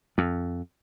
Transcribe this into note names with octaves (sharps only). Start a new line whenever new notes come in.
F2